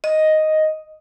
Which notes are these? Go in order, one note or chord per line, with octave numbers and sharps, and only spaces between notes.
D#5